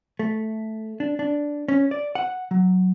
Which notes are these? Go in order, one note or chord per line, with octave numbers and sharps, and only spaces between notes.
A3
D4
D4
C#4
D5
F#5
F#3